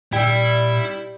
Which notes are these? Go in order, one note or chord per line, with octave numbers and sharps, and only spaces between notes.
A#2 G3 E4 E5 G5